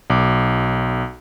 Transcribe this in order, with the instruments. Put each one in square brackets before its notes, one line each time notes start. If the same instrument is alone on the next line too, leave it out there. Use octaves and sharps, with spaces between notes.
[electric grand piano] B1 D6